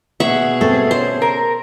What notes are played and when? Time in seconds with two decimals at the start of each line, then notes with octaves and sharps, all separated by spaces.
0.20 B2 G#4 E5 F#5 C#6
0.61 A3 C4 A4
0.91 C#4 C5
1.22 A#4